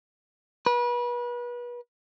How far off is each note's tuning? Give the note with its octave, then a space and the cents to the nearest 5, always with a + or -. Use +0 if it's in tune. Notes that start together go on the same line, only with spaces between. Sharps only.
B4 -35